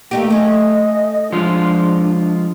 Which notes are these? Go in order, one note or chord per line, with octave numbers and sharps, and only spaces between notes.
A3 A#3 D#4 G4
A3 C#4 D#5
F3 G#3 D4 F4